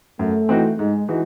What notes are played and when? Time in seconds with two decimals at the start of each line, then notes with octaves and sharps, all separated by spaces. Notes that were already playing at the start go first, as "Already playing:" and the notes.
0.19 F#2 A3
0.49 E3 C4 D#4 F#4
0.79 G#2 G#3
1.08 E3 G#3 D#4 F#4